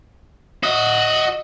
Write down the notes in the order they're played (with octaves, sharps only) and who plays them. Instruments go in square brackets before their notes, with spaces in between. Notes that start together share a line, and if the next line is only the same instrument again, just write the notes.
[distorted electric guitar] F#4 [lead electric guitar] D#5 E5